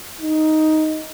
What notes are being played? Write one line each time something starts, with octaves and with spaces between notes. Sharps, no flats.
D#4